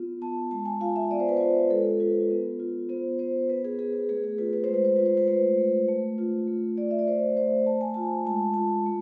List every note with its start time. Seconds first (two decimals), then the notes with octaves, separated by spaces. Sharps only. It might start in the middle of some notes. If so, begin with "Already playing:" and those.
Already playing: B3 F4
0.22 B3 A5
0.51 G#3 A5
0.65 G#5
0.80 F4 F5
0.96 E5
1.11 B3 D5
1.20 C5
1.29 B4
1.37 F4 C5
1.70 G#3 A4
2.00 F4 B4
2.30 B3
2.59 F4
2.89 B3 C5
3.19 B3 C5
3.49 B3 B4
3.64 G#4
3.79 B3 G#4
3.93 G#4
4.09 A3 G#4
4.24 G#4
4.38 F4 B4
4.53 B4
4.64 G#3 C5
4.74 B4
4.85 C5
4.96 F4 B4
5.06 C5
5.17 B4
5.28 A3 C5
5.58 A3
5.88 A3
6.18 F4
6.48 A3
6.77 A3 D5
6.91 E5
6.99 D5
7.07 A3 C5
7.37 A3 C5
7.66 A3 A5
7.81 G#5
7.94 F4 A5
8.26 G#3 A5
8.54 F4 A5
8.86 A3